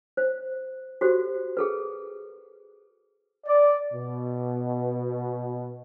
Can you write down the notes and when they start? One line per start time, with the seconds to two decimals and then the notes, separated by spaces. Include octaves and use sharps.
0.17 C5
1.01 F#4 G4 A4 C5
1.57 G#4 A4 B4
3.45 D5
3.93 B2